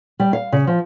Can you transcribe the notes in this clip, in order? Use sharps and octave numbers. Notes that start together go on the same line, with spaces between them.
G3
F5
C#3
F3